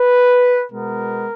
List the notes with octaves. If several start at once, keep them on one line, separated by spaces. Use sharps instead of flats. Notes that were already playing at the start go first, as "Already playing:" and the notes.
Already playing: B4
B2 G#3 B3 A#4